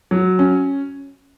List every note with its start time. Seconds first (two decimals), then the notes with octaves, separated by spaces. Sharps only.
0.11 F#3
0.39 C#4